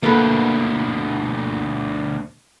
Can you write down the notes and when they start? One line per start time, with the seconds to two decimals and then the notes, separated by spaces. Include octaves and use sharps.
0.03 D2 B2 A#3 A4 B4